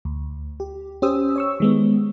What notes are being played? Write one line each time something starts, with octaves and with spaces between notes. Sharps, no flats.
D2
G4
C#4 G4 C5 D#6 E6
C#5 C#6 E6
D#3 G#3 B3